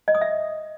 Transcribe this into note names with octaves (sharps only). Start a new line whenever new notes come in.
D#5
D#6
E5